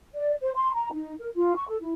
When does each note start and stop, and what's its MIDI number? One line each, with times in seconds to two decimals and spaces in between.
0.14 0.32 74
0.41 0.50 72
0.55 0.72 84
0.74 0.91 82
0.92 1.14 63
1.20 1.29 70
1.34 1.54 65
1.56 1.65 85
1.69 1.77 69
1.81 1.94 64